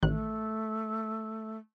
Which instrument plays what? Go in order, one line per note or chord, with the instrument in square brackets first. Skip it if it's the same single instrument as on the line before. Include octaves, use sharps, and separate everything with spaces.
[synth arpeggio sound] A1 D#3 F#6 [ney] A3